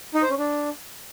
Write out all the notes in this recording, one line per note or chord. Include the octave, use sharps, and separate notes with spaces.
D#4
C5
C#4
D4